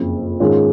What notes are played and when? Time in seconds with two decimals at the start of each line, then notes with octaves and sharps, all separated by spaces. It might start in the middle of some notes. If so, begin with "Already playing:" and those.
Already playing: F#1 F2 C#3
0.40 G#2 D#3 G#3 C#4 F4